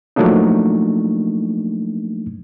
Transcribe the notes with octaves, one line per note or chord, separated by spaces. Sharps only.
F3 F#3 A3 A#3 D4 D#4